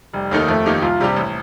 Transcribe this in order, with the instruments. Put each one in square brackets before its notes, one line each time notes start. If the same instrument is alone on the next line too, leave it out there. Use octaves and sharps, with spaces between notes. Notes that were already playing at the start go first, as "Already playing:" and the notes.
[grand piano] F1 [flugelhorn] G3
[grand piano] D#2 D#3 A3 D#4
[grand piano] F2 [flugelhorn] A3
[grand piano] D#3 A#3 D#4 G4
[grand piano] C2 [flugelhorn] F4
[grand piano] C3 G3 D4 G4
A1